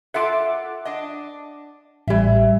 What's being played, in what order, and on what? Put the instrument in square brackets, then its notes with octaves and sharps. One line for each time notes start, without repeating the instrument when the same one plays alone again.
[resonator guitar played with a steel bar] F4 A4 E5 [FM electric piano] F#5 D6
[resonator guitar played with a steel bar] D4 D#5
[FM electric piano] A1 G3 [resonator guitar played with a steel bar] E3 E5